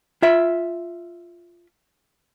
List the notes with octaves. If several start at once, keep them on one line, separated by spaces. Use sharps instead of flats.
F4 E5